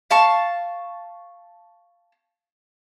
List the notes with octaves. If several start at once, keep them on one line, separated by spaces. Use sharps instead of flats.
F5 A5 C#6